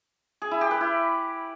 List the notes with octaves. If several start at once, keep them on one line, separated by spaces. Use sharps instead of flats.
G#4
E4
G4
B4
E4